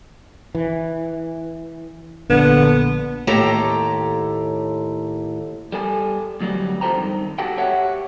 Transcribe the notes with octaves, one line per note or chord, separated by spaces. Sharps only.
E3
A#1 D3 B3
D#2 A2 G4 A4 A#5
G3 A4 G#5
D2 F#3 G3
F2 F4 A4 C5 G5 A#5
G2 D#3
F#4 G4 A4 F#5 G5
G4 C#5 E5 F#5